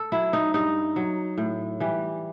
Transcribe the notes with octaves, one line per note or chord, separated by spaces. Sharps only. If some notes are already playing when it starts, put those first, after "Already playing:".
Already playing: A4
F#3 E4
D#4
G2 D#4
F#3
A2
E3 G3